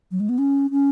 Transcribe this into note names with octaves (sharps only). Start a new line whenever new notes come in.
F#3
G#3
B3
C#4
C#4